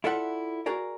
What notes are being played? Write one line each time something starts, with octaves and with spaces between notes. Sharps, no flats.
E4 F4 A4 D5 E5 F#5
F#4 G#4 A#4 D5